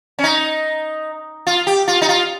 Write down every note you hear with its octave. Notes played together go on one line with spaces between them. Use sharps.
C#4
D#4
F4
G4
F4
D#4
F4